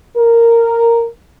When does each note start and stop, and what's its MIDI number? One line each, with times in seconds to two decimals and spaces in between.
0.17 1.10 70